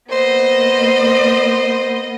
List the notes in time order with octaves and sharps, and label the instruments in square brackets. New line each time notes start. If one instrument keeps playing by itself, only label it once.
[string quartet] A#3 B3 D#5 [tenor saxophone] C5